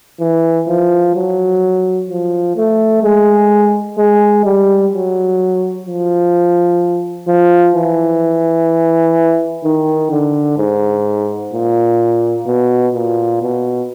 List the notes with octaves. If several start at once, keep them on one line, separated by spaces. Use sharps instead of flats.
E3
F3
F#3
F3
A3
G#3
G#3
G3
F#3
F3
F3
E3
D#3
D3
G#2
A#2
B2
A#2
B2